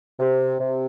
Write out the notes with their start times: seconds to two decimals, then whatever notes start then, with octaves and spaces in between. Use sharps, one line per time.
0.19 C3
0.59 C3